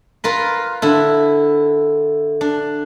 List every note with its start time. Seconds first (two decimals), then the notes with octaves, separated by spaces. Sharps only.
0.24 F4 A#4 B4
0.82 D3 D4 E4
2.41 D4